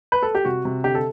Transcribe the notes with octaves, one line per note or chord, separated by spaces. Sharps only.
B4
A4
G4
C3 F#4
C3
D3 G4
A4